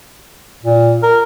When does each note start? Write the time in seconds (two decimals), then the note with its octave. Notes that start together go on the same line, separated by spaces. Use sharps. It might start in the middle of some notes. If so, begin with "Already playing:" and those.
0.64 A#2
1.03 A#4